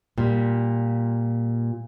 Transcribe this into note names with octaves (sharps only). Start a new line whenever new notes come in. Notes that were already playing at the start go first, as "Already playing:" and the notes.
A#2 G3